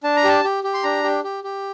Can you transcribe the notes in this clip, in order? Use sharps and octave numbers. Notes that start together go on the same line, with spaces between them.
D4 A5
A#5
G4 A5
G4
G4
C6
D4 A#5
G4
G4
G4